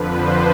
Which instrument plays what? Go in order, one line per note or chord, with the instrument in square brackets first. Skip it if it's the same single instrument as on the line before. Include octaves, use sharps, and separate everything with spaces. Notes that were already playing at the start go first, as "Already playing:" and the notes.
Already playing: [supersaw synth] F2 D3 F3 B4
C5